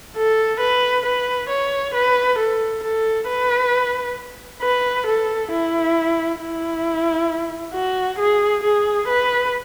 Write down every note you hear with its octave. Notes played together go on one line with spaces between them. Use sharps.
A4
B4
B4
C#5
B4
A4
A4
B4
B4
A4
E4
E4
F#4
G#4
G#4
B4